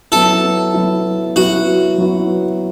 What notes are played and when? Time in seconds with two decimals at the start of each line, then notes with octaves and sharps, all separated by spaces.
0.12 F#3 B3 E4 A4
0.74 F#3 B3 E4
1.36 F#3 B3 E4 F#4
1.98 F#3 B3 E4